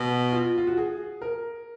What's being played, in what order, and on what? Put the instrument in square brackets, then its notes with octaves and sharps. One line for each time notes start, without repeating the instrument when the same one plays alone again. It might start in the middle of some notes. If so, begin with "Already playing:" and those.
Already playing: [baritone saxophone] B2 [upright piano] F#4
[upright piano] F4
F4
F#4
G#4
A#4